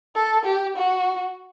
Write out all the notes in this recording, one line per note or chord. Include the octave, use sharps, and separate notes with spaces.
A4
G4
F#4